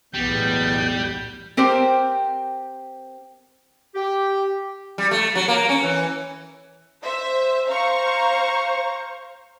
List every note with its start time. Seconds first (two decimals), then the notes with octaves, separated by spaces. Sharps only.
0.14 B1 E2 A2 G3 B3 G6
1.57 C4 G4 A#4 C5 G5
3.95 G4
4.98 G3
5.11 A3
5.35 F#3
5.48 A#3
5.69 C#4
5.83 E3
7.03 C5 E5
7.68 C5 F5 A#5 C#6